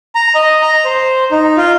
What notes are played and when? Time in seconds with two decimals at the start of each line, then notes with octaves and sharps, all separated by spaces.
0.15 A#5
0.35 D#5
0.62 A#5
0.85 C5
1.31 D#4
1.57 F4